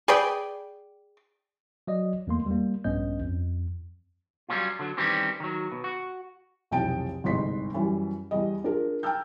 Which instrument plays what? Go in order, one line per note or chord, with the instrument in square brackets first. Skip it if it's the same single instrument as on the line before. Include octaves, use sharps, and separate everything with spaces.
[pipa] G#4 B4 D5 G5
[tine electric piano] F#3 D5 D#5
E2 A3 A#3 C6
G3 A#3
A#1 G2 B3 C#4 D#5 G6
F2
[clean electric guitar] F#3 G3 A3 A#3 C#4 F4
D3 F#3
D#3 E3 G3 C4 C#4 G4
D#3 F#3
B2
F#4
[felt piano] F1 B1 E3 G5 A5 D7
G1 C2 G#2 D#4 C6 B6
F#2 E3 G3
E2 G3 D#5
D4 F4 G#4 A#4
G5 A5 A#5 E6 F6 G6